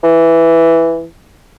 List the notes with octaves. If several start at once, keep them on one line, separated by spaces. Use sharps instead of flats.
E3